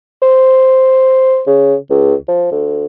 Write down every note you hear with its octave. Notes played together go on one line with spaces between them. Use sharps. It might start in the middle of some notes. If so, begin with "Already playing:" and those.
C5
C#3
C#2
F3
D2